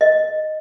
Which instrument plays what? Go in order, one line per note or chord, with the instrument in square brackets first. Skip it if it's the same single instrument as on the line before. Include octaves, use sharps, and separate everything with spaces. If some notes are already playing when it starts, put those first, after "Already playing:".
[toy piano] D#5